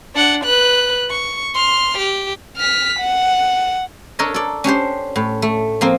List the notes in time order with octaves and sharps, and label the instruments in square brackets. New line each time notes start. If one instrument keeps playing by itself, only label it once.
[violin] D4 F#5
B4 F#6
C#6
C6 F6
G4
F6 B6
F#5
[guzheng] D4 A4 A#4 C#5 D#5
A4 D5
C#4 D4 G4 C5
A2
A3
F3 A#3 C4